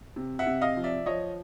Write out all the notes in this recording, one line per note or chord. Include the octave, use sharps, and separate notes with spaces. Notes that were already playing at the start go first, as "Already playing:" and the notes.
C3
E5 F#5
C3
D#5 F5
F3
D5 E5
F3 C#5 D#5